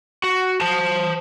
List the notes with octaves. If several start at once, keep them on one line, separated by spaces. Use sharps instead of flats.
F#4
C5 A5